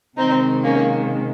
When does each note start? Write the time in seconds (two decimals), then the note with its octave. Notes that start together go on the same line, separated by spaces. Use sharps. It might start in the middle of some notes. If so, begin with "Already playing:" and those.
0.17 C3 D#3 G#3 C4 D#4
0.64 A#3 C#4